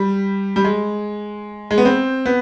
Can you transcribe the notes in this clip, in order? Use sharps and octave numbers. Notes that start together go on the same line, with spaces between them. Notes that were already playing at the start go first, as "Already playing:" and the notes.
Already playing: G3
G3
G#3
G#3
B3
C4
B3